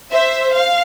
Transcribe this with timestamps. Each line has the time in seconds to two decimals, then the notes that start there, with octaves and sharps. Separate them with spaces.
0.12 C5 E5
0.53 F5